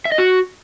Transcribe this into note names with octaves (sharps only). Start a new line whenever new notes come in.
E5
D#5
F#4